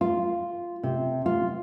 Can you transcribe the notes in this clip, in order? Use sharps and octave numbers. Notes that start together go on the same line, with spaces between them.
F4
C3
F4